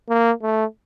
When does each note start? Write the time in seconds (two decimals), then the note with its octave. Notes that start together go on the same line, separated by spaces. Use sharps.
0.09 A#3
0.42 A3